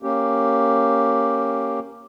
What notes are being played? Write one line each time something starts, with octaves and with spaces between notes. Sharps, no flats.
A#3 C#4 G4